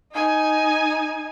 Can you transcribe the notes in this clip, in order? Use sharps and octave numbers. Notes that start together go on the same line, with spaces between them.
D#4 G#5